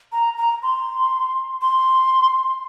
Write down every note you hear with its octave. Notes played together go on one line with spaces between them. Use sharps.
A#5
A#5
C6
C6